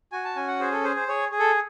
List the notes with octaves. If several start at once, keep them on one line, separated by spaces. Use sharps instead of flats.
F#4 G#5
A5
C#4 G#5
F#5
G#4 C5
A4
G#4 C5
C5
G#4 C#5
G#4
A4